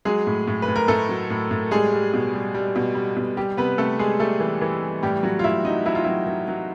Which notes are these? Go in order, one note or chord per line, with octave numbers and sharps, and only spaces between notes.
F#3 G#3 G#4
A2
A2
B4
A2
A#4
A2 A3 A4
F#3
A2
A2
G3 G#3 G#4
G3
B2
G3
G3
B2
G3
B2
G3 G4
C3 B3 B4
C3 A3 A4
G3 G#3 G#4
G3 A3 A4
E3
E3
G3
A2 G3 G4
F#3 F#4
F4
A2 E4
F#3 D#4
F#3 E4
F4
F#3 E4
F#3
F#3